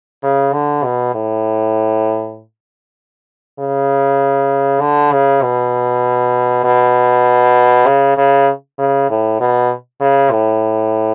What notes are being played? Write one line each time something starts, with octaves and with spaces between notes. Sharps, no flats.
C#3
D3
B2
A2
C#3
D3
C#3
B2
B2
C#3
C#3
C#3
A2
B2
C#3
A2